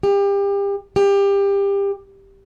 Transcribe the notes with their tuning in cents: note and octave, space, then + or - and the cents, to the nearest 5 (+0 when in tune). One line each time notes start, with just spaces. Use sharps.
G4 +30
G4 +25